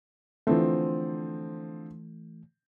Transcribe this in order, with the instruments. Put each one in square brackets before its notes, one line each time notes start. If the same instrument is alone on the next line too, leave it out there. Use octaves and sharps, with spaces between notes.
[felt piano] D3 F3 C4 [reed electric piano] E3 A3